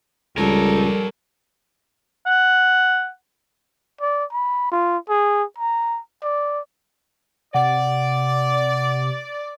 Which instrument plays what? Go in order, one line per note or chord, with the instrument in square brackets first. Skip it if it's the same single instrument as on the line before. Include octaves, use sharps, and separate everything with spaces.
[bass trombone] C#2 [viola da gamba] G3 [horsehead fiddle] A4 [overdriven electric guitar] A#4 C#5
[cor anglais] F#5
[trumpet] D5
B5
F4
G#4
A#5
D5
[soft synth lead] C3 [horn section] D5 [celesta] F#5